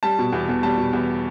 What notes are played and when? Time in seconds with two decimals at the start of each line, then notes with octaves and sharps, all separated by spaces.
0.03 G3 A5
0.19 B2
0.33 E2
0.49 E2
0.63 G3 A5
0.78 B2
0.93 E2